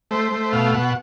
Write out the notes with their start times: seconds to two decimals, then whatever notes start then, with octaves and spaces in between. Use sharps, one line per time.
0.11 A3 C5
0.32 A3
0.53 B2 F5
0.74 B2 F#5